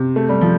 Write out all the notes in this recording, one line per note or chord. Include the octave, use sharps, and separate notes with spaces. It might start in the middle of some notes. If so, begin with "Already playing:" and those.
Already playing: C3
A3
G3
F3